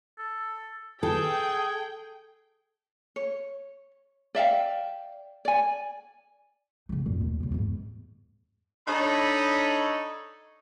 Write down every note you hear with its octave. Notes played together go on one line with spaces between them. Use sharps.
A4
G#4 A4 G5
C#5
D5 E5 F5 G5
D5 G#5
C#3 D#4
F#2 A#2
D#2
F#2 C#3
E2 G#2
D4 D#4 A4 C#5 D#5 B5